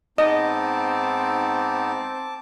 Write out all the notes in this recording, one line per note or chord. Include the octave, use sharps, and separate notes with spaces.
G#2 B3 C4 D#4 D#5 A5 D6